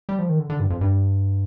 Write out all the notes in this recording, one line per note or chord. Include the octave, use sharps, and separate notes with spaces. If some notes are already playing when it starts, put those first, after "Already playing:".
G3
F3
D#3
D3
D3
G2
F2
G2